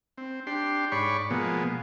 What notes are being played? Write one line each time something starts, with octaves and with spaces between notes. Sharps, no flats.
C4
D4 G4 C6
G#2 C#5 D5 B5 C#6
B2 F3 G#3 A#3 B3